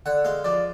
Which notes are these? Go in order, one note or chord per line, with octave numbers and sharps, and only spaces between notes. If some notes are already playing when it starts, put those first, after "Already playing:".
D3 F#5
G#3 F5
F3 D5